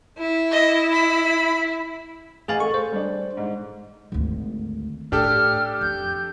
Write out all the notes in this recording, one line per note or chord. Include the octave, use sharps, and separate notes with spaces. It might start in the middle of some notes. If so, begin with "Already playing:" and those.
E4
D#5
B5
A1 G#4 F5 G#5 A6 F#7
A3 A4 C#6
C5
G3 D4
G#2
G#1 D2
A2 D4 G4 A4 F6
F2 G6